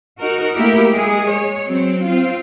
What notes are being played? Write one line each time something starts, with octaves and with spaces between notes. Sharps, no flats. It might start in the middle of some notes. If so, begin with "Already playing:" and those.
D#4 F#4 A#4
A3 A#3 E4 G4 A#4
G#3 G#4
C#5
F#3 C4
C4 F4